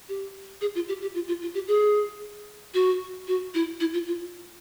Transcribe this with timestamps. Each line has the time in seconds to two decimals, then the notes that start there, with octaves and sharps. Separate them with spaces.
0.09 G4
0.61 G#4
0.75 F4
0.88 G4
1.02 G4
1.15 F4
1.28 F4
1.42 F4
1.54 G4
1.68 G#4
2.74 F#4
3.28 F#4
3.54 E4
3.80 E4
3.93 F4
4.07 F4